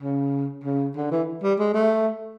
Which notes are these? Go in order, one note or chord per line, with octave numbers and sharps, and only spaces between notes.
C#3
C#3
D3
E3
G3
G#3
A3